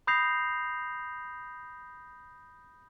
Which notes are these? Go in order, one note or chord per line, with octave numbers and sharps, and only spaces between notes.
B5 D#6 G6 A#6 C7 F7